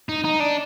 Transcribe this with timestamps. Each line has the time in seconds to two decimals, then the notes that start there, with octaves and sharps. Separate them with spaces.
0.09 D#4
0.24 D#4
0.40 D4